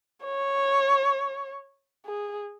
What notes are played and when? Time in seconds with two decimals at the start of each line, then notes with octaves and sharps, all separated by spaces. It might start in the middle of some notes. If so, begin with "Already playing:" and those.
0.24 C#5
2.06 G#4